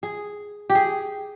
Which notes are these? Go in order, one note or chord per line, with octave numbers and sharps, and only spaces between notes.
G#4
G4
G#4